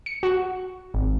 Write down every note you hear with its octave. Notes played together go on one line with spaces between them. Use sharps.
C#7
F#4
G#1